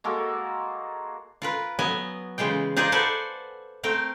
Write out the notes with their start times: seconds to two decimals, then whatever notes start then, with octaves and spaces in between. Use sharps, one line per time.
0.04 G#3 A#3 F#4 A4
1.42 F4 A#4 B4
1.79 F#3 B3 D#5 G#5
2.38 C#3 E3 G#3 F4 G5
2.76 D#4 F4 G#4 A#4 C5 D5
2.92 A4 B4 C5 D5 F#5 G#5
3.83 A3 C4 A#4 G5